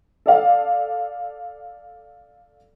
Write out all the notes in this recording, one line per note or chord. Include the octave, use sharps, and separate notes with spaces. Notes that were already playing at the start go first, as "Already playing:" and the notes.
A4 D5 F5